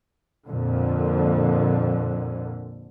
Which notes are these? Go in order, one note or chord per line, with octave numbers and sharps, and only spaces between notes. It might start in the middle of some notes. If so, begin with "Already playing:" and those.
F2 A#2 D3